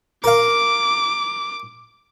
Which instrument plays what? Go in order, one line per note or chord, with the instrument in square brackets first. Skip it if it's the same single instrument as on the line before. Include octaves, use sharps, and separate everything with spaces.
[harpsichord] A#4 F5 [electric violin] D6